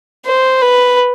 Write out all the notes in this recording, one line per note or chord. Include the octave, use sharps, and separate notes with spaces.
C5
B4